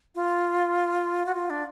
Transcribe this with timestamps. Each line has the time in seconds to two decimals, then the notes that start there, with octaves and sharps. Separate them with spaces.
0.15 F4
1.26 F#4
1.35 F4
1.50 D4